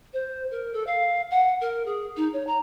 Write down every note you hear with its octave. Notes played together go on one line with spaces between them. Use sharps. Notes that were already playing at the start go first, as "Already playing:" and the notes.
C5
A#4
A4
F5
F#5
A#4
G#4
D#4
C#5
A#5